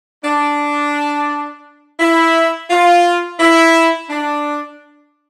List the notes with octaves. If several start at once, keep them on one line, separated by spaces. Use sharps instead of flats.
D4
E4
F4
E4
D4